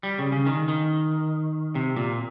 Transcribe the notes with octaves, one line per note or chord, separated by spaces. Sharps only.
G3
C#3
C#3
D#3
D#3
C3
A#2